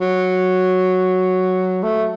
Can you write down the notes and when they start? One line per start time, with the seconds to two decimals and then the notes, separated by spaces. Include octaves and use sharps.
0.01 F#3
1.83 A3